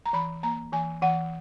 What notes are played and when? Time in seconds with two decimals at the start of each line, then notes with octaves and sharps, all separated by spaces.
0.06 A#5
0.13 E3 B5
0.43 A#3 A#5
0.73 E3 G#5
1.02 E3 F#5